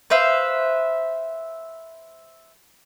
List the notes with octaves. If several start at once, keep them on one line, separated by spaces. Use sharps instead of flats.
B4 C5 E5 F5